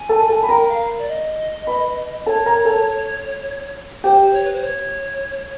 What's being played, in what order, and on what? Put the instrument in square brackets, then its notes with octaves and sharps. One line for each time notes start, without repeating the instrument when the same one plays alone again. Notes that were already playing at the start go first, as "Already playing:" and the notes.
Already playing: [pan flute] G#5
[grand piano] A4 A5
A4 A5
[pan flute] G#5 [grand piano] B5
[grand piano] A#4 A#5 [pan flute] G5
[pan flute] F5
D5
D#5
[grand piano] B4 B5
[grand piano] A4 A5 [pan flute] C#5
[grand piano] A#4 A#5
A4 A5
[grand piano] G4 G5 [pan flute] C5
[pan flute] C#5
B4
C5
C#5